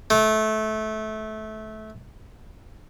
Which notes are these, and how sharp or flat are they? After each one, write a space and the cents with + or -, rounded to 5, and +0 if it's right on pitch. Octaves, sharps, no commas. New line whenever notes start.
A3 -20